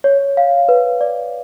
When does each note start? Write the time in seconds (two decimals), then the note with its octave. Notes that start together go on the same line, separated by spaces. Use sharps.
0.04 C#5
0.37 F5
0.69 B4
1.01 D5